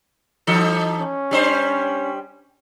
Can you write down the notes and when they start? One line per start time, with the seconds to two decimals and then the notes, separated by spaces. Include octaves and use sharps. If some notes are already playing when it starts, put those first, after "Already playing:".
0.47 E3 D#4 A4
1.01 C#4
1.31 G3 D4 C5